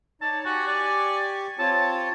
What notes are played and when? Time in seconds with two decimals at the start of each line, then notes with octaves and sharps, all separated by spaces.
0.21 D#4 C#5 D5 A5
0.45 F#4 G4 G#5 C#6
0.68 D5
1.59 C4 F4 C#5 A5